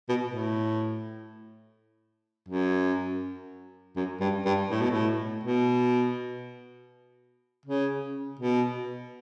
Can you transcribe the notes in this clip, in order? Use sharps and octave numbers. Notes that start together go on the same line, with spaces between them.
B2
A2
F#2
F#2
G2
G2
A2
B2
A2
B2
C#3
B2